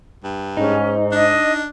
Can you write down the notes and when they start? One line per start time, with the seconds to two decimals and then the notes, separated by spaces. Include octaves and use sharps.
0.24 G2
0.57 G#2 C#4 D#4
1.12 D4 D#5